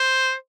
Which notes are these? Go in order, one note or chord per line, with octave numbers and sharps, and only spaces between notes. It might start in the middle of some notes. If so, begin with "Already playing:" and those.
Already playing: C5